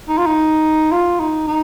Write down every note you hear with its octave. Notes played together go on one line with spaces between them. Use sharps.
D#4
F4
D#4
F4
D#4
D#4